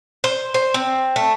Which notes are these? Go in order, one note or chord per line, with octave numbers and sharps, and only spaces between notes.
C5
C5
C4
A3